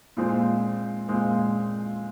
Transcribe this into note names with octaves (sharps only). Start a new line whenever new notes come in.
A#2 F3 G#3 C4
A#2 F3 G#3 C4